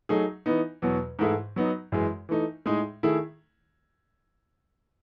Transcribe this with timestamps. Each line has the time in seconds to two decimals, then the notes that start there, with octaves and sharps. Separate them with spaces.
0.09 F#3 A3 D#4 G#4
0.46 E3 B3 D#4
0.82 E2 B2 F#3
1.19 G#2 E3 A3 E4 G#4
1.56 F#3 B3 D#4
1.92 F#2 E3 G#3
2.29 E3 A3 D#4
2.66 A2 G#3 D#4 G#4
3.03 D#3 A3 E4 G#4